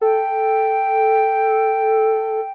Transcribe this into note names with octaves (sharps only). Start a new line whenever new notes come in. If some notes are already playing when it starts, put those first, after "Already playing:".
A4 G5